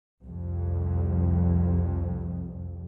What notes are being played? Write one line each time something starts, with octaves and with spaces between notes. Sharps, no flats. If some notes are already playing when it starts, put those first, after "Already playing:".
C2 F2